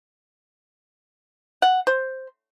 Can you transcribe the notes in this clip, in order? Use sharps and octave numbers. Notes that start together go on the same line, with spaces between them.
F#5
C5